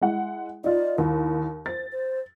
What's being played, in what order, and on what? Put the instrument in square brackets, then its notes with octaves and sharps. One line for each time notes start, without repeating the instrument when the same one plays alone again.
[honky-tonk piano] G#3 E4 F#5
[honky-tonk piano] D#4 F4 [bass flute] D5
[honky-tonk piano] D#2 [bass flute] E4
[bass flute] C5 [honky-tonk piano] A6
[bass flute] C5